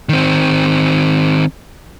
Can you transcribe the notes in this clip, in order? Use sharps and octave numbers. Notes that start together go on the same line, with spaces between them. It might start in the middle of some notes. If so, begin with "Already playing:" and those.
D#3 C4